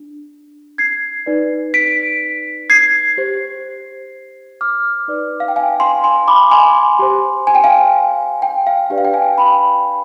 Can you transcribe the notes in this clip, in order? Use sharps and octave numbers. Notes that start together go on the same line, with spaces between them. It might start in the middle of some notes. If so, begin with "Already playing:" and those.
Already playing: D4
G#6 C7
D#4 B4 D5
B6 D7
G#6 C7
G4 C5
D6 F6
D#4 B4 D5
F5
G5
F5 G#5
G#5 C6
G#5 C6
B5 D6
G#5 C6
G4 C5
G#5
G5
F5 G#5
G5
F5
D4 G4 B4 D5 G5
F5
G5
F5 G#5
G5 B5